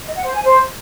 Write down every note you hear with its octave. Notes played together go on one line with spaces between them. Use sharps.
D#5
F#5
C5
G#5
C5